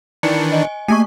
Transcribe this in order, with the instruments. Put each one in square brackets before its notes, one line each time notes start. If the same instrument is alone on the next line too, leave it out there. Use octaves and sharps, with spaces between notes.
[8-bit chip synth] D#3 E3 D4 [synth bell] C#7
[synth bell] D#5 G#5
[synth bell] A3 A#3 C#6 [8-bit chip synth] G#5